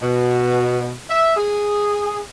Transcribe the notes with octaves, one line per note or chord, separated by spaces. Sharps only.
B2
E5
G#4